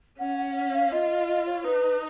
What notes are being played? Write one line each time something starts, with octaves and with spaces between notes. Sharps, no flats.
C#4 F#5
F#5
F#5
F5
F4 D#5
D#5
C#5
D#4 B4